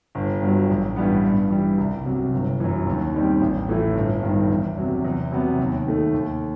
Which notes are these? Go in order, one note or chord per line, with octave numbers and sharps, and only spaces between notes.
G1
G2 F#3
A1
G2 E3 G3 B3
G2
E3 G3
C2
C3 F#3
G1
F#2 E3
D#2
D#3 G3 C4
A1
A2 E3 A3
G1
G2 D#3
E2
C3 F#3
E2
C3 F#3 B3
D#2
D#3 A3
D#2